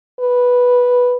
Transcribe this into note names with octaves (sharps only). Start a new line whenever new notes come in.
B4